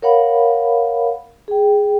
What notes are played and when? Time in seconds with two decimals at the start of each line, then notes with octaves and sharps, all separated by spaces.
0.02 A#4 C#5 F5 F#5 B5
1.48 G#4 G5